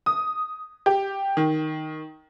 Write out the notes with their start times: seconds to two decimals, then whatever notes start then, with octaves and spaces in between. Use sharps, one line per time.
0.06 D#6
0.86 G4
1.37 D#3